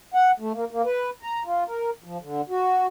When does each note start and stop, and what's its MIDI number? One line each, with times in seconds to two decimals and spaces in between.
0.14 0.31 78
0.40 0.52 57
0.54 0.65 58
0.71 0.82 58
0.85 1.10 71
1.23 1.43 82
1.45 1.64 65
1.67 1.90 70
2.04 2.18 53
2.21 2.41 50
2.50 2.86 66